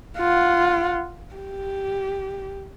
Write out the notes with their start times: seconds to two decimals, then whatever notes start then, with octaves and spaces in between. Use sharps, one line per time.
0.18 F4 F#5
1.35 G4